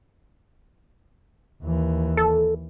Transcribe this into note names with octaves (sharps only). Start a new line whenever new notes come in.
D#2 E3
A4